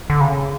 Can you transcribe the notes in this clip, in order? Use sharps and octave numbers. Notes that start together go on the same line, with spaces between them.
D3
C#3